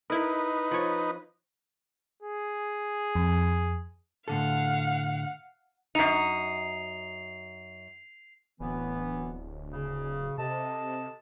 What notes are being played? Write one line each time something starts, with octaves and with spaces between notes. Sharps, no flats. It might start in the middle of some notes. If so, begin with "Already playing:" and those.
D#4 E4 A#4 B4
F3 C#5
G#4
F2
A2 D3 A4 F5 F#5
F#2 D#4 C7 F7
D1 E3 B3
C#3
C3 A4 D#5 A5